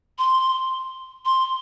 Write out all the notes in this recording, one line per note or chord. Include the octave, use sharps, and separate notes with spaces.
C6
C6